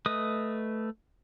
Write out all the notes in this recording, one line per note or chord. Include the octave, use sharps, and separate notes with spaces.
A3 B4 D#5 D#6